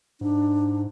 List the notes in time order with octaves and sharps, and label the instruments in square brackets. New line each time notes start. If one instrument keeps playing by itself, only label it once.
[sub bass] G#2 [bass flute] D4